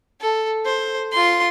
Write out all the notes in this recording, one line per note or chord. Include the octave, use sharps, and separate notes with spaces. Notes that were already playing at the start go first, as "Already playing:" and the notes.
A4
C5
F4 C6